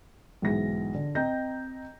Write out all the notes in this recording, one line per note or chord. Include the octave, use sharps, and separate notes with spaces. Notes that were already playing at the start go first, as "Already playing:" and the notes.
B1 G#2 E3 A#6
D3
C4 D#5 G5 A#5 G6 A#6